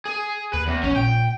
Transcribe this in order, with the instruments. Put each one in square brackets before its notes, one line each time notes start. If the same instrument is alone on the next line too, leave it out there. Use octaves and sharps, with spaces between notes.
[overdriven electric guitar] G#4
[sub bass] D#2 [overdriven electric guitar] B4
[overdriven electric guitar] E2
[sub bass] A#1 [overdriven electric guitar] C#4
[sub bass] A#2 [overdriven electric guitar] G5